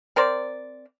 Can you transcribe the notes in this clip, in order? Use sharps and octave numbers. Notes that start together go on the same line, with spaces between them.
C4 A#4 C5 D5